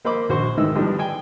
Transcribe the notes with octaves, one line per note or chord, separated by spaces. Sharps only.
A#3 C5 D#5 B5 D6
A#1 F#4 C5 C#6
G#2 D#3 E3 E4 D#5 E6
D3 F3 G3 B3 D4 D#4
G5 G#5